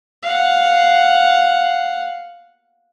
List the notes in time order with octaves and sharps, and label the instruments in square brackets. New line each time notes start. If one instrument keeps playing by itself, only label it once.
[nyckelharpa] F5 F#5